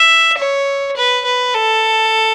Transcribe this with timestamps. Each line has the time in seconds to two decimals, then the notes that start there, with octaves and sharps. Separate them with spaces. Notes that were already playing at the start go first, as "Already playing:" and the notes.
Already playing: E5
0.37 C#5
0.96 B4
1.25 B4
1.54 A4